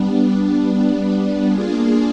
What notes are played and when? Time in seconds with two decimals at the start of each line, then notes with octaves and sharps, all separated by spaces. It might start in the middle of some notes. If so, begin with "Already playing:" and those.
Already playing: G3 B3 D4
1.47 A#3 D4 F4 G#4